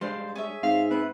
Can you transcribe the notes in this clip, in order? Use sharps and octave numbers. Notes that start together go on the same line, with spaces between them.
G3 G#3 D4 C5 F5 C6
C#4 G#4 E5
G#2 C4 F5
B3 C4 B4